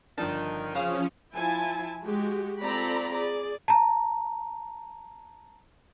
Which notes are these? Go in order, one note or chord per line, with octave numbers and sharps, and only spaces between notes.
G1 D#3 F3 D4 A5
C#3 F3 C#4 C5 F5 D#6
F3 E4 G#5 A5
G#3 F#4 G4
C4 F4 A4 D5 A#5 B5
G#4 D5
A5 A#5